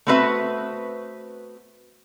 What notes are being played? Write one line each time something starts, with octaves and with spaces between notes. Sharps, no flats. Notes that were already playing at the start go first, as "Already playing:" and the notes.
A3 B3 C4 F#4 B4 E5